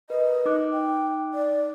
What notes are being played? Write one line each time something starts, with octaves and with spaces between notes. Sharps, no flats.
A#4 B4 D#5
D#4 D6 F#6
G5
D5